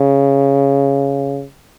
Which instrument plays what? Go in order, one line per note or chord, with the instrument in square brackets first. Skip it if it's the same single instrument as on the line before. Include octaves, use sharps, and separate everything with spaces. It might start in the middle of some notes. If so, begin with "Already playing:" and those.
Already playing: [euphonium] C#3